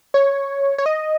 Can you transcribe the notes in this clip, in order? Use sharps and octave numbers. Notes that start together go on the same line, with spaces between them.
C#5
C#5
D#5